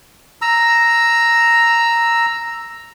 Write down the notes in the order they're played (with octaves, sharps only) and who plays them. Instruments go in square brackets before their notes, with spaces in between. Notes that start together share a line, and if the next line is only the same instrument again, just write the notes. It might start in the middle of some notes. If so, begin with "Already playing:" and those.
[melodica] A#5 E6